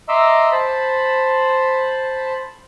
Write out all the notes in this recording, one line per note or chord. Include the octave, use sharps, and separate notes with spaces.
D#5 E5 A#5 C6 D6 E6
C5 A5 B5